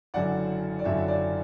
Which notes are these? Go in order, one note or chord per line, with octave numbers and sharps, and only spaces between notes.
F#1 F#2 D3 F#3 D5 F#5
D5
F#1 F#2 D3 F#3 C#5 E5
E5
D5